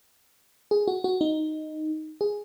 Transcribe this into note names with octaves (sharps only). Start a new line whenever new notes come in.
G#4
F#4
F#4
D#4
G#4